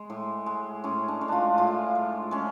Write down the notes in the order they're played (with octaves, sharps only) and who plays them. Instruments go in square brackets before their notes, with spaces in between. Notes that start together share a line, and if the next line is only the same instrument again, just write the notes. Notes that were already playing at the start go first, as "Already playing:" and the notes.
Already playing: [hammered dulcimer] G#3
A2
G#3
A2 C#4
D4
G#3
D4 F4
A2 F4
G#3
G#3 C#4